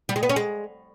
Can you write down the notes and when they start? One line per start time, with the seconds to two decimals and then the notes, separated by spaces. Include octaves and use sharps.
0.09 G3
0.16 G#3
0.23 B3
0.29 C#4
0.36 G#3